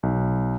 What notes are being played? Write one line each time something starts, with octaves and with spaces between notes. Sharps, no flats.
B1